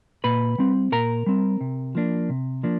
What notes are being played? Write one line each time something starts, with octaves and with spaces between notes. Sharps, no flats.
A#2 B4 B5
G3 C4
A#2 A#4 A#5
G3 C4
C3
F3 A#3 D4
C3
F3 A#3 D4